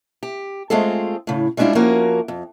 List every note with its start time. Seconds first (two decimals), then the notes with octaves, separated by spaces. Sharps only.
0.23 G4
0.70 G#3 A3 C4 F4 G#4 A4
1.27 A2 C#3
1.57 G3 G#3 C#4 D4 E4 F4
1.75 F3 A#3 C#4 F#4 A#4
2.28 F2